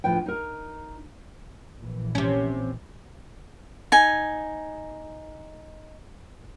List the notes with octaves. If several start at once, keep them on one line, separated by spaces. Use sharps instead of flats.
D2 A2 F3 B4 G5
D#4 A#4
A#1 A#2 E3
C3 C#4
D#4 G#5